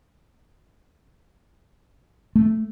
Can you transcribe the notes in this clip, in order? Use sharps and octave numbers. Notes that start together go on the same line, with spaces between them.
A3